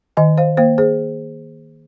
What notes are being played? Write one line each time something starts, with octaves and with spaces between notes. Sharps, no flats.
D#3 D#5 G#5
C5 F5
A#3 C5 F5
G#4 C5